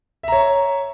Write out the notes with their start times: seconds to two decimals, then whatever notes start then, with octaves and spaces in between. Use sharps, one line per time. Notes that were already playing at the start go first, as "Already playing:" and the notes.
0.23 E5
0.28 A#5
0.32 C#5